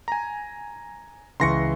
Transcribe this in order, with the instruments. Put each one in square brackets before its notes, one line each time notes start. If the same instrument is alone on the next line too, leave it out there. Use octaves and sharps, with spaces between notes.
[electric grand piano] G#5 A#5
[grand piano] C#2 E3 C#6 [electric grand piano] C6 A#6 C#7